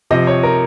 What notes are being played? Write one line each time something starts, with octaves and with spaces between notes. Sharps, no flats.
C3 F3 D#5
C#5
A#4